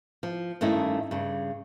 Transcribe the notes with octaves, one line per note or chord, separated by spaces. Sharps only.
F3
G2 D#3 A3 C#4 D#4 E4
G2 C#3